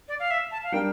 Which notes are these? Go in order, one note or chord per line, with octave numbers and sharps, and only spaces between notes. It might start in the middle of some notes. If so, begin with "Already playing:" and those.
D5
F5
E5
A5
F5
G3 D4 G4 A#4 G5